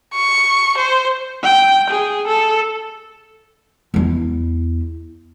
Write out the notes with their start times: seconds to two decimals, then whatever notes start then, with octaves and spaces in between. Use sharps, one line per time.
0.14 C#6
0.77 C5
1.43 G5
1.90 G#4
2.27 A4
3.94 E2 E4